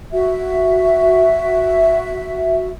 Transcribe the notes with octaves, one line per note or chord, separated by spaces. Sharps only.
F#4 E5